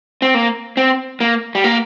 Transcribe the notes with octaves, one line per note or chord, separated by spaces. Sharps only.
C4
A#3
C4
A#3
G3
A#3